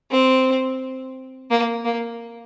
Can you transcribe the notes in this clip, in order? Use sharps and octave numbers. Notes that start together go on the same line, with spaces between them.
C4
A#3
A#3